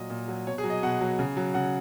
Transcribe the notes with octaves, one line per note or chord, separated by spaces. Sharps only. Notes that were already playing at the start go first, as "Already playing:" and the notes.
Already playing: A#2 F#3 D#5
A#2
F#3
B2 C#5
G#4
F#3
D#5
B2 F#5
F#3
C#3
F#3
C#3 F#5